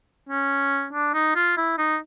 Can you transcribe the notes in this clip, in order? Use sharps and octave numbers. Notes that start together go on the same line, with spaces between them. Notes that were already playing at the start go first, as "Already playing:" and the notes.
C#4
D4
D#4
F4
E4
D#4